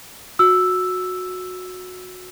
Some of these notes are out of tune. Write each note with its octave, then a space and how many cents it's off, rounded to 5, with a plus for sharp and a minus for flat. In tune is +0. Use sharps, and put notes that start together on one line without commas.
F#4 -20 E6 +0